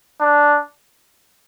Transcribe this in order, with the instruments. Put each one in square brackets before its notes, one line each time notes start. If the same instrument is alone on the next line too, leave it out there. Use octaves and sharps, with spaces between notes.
[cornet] D4